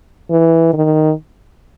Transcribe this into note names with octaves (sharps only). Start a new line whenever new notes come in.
E3
D#3